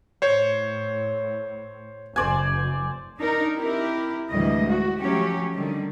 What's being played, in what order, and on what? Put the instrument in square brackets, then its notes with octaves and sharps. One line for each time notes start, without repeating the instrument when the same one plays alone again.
[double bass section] A2 [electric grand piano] C5 C#5
[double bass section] F#1 [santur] C5 D5 G#5
[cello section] D4 D#4 A#4
C4 E4 G4 A#4
D2 A2 E3 G3 G#3 D#5
F#4
F3 F#3 A3 C#4 G4 C#5
D3 D#3 G3